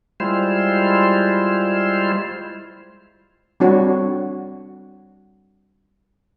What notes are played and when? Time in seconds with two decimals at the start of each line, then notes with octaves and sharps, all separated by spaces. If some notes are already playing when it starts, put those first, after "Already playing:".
0.20 G3 G#3 E4 F4 C5
3.60 G3 C4 D4 F#4 C#5